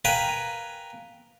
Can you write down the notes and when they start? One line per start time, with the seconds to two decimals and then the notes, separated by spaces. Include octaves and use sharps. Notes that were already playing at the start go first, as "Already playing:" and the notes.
0.05 A#4 B4 F5 G5 G#5